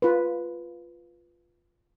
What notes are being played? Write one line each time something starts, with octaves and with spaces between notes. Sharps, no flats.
F4 B4